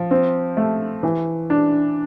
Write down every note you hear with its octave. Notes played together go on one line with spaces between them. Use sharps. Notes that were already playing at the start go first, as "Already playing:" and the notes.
Already playing: F3
C4
A3
E3
D4